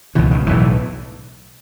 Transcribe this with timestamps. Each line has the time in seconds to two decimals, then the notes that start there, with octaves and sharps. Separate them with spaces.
0.15 C#2 B2 E3
0.31 D#3
0.47 B1 A2 E3